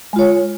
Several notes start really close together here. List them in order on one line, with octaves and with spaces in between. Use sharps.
G#3 F4 C#5